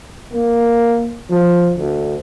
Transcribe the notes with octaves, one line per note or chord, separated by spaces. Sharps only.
A#3
F3
D2